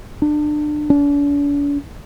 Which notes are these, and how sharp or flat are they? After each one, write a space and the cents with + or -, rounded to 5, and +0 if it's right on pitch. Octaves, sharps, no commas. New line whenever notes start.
D4 +30
D4 -45